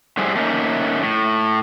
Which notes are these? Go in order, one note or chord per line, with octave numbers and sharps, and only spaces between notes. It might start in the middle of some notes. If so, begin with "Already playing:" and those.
A2 D3 G3 G#4 C5 E5
A3 A#3 C#4 D#4
A2